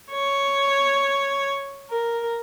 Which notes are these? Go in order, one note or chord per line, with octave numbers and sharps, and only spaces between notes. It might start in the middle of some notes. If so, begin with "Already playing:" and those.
C#5
A#4